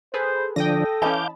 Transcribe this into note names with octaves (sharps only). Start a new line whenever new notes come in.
G#4 A4 B4 C5
D3 F3 D4 A4 G5 D#6 A#6
E3 C#4 D#5 F5 A5 B5 D6 G6